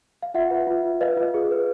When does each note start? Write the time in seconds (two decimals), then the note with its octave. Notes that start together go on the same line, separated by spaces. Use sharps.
0.23 F5
0.34 F4 E5 F#5
0.50 B4
0.67 F4
0.84 F4
1.01 B4 D#5 F5
1.17 F4
1.34 G#4
1.51 B4